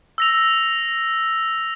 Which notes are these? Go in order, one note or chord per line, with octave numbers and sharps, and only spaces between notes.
E6 A#6 F7